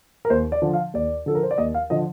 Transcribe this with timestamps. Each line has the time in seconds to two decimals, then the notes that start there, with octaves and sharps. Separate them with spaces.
0.25 A#4
0.30 D#2 C5
0.52 D5
0.62 D3 F3
0.73 F5
0.94 D#2 D5
1.26 D3 F3 A4
1.35 A#4
1.43 C5
1.51 D5
1.58 D#2 D#5
1.74 F5
1.90 D3 F3 D#5